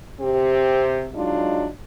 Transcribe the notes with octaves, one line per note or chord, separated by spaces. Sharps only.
C3 C4 G4
F#3 G#3 D4 D#4 F4